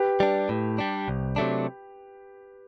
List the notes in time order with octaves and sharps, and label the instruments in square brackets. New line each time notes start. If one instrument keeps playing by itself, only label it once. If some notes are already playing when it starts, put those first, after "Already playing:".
Already playing: [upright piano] G4 B4
[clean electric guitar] G3 D4
A2
G3 D4
C2
C3 F#3 A3 D4